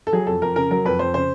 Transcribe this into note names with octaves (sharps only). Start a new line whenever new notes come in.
A4
F#3 G#4
F2 A4
F2 A#4
C#3 A#4
F#3 A#4
F2 B4
F2 C5
C#3 C5